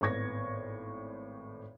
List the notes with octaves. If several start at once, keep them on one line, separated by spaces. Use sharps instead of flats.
G#1 A2 B3 C#6 G#6 A#6